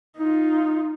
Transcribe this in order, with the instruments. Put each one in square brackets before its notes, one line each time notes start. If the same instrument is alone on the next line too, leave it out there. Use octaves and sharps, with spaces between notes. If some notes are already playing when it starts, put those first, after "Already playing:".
[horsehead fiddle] D#4 F4